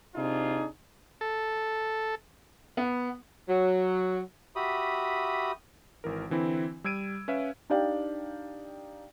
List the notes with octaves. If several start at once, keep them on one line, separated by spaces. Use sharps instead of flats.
C3 D4 D#4 F4 G#4
A4
B3
F#3
F#4 G4 E5 B5 D#6
G#1 E3 A#4
D3 E3 C4 E4
G3 E6 G#6 D7 D#7
C#4 B4 E5 F5
D4 D#4 G4 D5 F5 G5